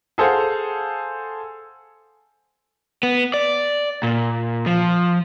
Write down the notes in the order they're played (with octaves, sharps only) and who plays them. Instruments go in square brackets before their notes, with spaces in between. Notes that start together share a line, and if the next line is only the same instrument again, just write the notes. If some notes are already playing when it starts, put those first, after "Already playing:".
[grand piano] G#4 A4 C5 F5 F#5
[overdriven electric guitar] B3
D5
A#2
F3